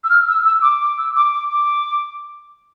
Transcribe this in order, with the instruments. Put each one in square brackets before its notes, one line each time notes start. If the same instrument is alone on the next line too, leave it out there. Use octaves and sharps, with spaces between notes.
[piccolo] E6
F6
E6
E6
D6
D6
E6
D6
D6
D6